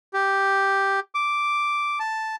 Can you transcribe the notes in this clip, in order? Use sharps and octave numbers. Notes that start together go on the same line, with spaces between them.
G4
D6
A5